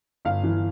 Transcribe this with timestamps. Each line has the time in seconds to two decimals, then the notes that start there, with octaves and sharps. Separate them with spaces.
0.25 G1 F5
0.43 E3